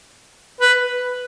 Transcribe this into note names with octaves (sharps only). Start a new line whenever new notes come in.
B4